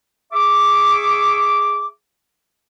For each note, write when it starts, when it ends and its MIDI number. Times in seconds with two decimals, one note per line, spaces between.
0.32 1.86 68
0.32 1.86 76
0.32 1.86 85
0.32 1.86 86